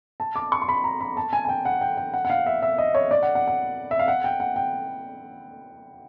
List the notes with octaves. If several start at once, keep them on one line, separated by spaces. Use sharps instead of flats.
A5
D6
C#6
C6
B5
A#5
B5
A5
G#5
G#5
G5
F#5
G5
G5
F#5
F#5
F5
E5
E5
D#5
C#5
D5
F#5
F#5
F#5
E5
F5
F#5
G5
F#5
G5